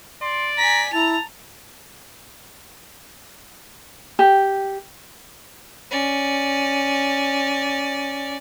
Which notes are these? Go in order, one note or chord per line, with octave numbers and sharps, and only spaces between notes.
D5 C6
G#5 A#5 B6
E4 A5 A#5 F7
G4
C#4 D5